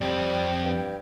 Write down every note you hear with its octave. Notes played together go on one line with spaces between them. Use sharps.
F2 G3 C4 G5
G2